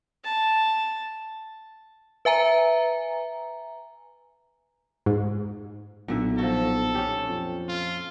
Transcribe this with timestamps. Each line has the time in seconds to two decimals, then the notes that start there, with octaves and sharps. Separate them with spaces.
0.25 A5
2.25 B4 E5 G#5 A#5
5.06 G#2
6.08 B1 A#2 D3 E5
6.38 F3 F#4 A4
6.95 C#4 G4
7.28 F2
7.69 F4